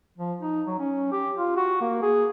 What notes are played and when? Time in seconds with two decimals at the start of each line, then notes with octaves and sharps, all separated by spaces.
0.18 F3
0.41 D#4
0.67 F#3
0.79 C#4
1.12 G4
1.37 F4
1.57 F#4
1.81 A#3
2.02 G#4